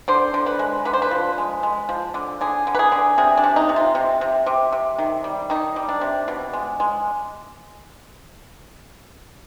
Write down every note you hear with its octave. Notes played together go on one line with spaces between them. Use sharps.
D3 C5
D3
B4
G#3
D3 B4
C5
B4
F3
G#3
G#3
F3
D3
D3 G#4
D3
B4
G#4
D3
C3 G#4
D4
C3
D#4
C3
F4
C3
C3
C3
C3
D#3
G3
D#3 D#4
G3
D4
C3
B2
G#3
G#3